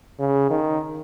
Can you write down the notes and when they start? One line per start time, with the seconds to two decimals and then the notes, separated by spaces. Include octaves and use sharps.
0.20 C#3
0.50 D#3